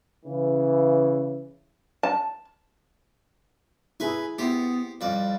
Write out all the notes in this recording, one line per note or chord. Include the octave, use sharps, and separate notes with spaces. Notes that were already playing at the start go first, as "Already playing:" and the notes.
C#3 E3
A5
E4 G#4 B4 G#5
B3 E4 G4 C5
F2 G3 D5